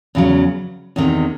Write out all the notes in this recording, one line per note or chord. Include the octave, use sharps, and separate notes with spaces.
E2 C#3 F#3
E2 C3 D#3